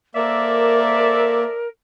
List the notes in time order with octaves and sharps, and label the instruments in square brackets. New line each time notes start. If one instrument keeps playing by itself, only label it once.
[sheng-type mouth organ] A#3 [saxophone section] A4 C5 E5 [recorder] A#4 [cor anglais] D5